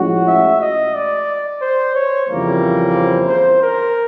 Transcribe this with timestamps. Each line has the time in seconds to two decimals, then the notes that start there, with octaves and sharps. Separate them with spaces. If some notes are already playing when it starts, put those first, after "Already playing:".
Already playing: A2 F3 G#3 C#4 F#4
0.27 E5
0.61 D#5
0.94 D5
1.61 C5
1.95 C#5
2.28 F2 C#3 E3 G3 A#3
2.95 C5
3.29 C5
3.63 A#4